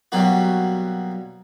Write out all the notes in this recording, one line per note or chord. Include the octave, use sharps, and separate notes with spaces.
B2 F#3 G3 A#3 F#4